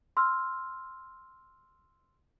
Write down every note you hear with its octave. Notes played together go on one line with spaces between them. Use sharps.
C6 E6 F6